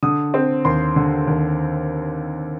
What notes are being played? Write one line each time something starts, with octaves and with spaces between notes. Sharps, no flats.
D3 D#6
C4
D#2 C6
D3
D#2